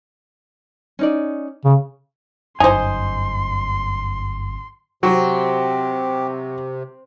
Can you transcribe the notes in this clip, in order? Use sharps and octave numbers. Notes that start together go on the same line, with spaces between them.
C#4 D#4 D5
C#3
G1 F#2 D#4 C5 G#5 C6
C3 F#3 C4 G4